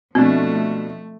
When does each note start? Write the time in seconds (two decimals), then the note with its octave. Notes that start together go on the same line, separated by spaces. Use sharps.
0.15 B2 F3 A3 C4 D4